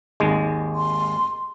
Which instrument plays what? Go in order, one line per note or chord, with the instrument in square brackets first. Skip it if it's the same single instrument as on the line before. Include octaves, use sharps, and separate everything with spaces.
[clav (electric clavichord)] G#1 D#2 G#3
[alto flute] C6